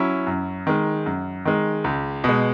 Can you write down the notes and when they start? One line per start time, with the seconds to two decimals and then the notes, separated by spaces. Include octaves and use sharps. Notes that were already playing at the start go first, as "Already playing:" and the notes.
Already playing: F#3 C#4 E4
0.27 F#2
0.67 D#3 G#3
1.06 F#2
1.45 D#3 G#3
1.84 C#2
2.24 B2 G#3